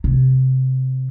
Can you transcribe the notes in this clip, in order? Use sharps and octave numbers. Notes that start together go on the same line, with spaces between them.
C3